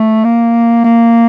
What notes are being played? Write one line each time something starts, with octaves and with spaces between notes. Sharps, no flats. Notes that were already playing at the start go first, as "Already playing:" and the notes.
Already playing: A3
A#3
A#3